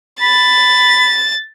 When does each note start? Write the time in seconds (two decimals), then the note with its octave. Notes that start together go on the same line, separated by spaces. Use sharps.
0.21 B5 A6